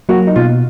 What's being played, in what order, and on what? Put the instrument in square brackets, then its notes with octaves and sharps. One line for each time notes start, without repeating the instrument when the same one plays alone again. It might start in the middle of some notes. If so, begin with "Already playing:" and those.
[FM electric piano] F#3 A#3 [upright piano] F#4
[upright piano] D#4
[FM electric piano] B2 [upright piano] F4